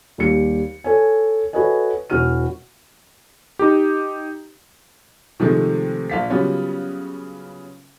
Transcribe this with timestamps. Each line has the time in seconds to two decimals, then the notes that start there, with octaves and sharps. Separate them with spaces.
0.18 D#2 G3 C#7
0.84 A4 C#5 G#5
1.53 F#4 A4 B4 C#5 D#5 G#5
2.10 E1 E3 F#4 F6 D#7
3.59 D#4 G4
5.40 C3 D#3 F3 G#3 A3 C4
6.10 A#1 F5 B6
6.30 C#3 F#3 G3 B3 C#4 F4